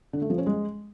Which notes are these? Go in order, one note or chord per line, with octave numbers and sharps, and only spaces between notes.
D3
A3
F3
C#4
G#3